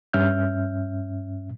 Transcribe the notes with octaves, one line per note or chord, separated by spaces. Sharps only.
G2 C#4 E5 F6 G6